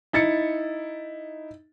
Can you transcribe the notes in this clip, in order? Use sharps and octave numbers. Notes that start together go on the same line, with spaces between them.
D#4 E4 A6 C#7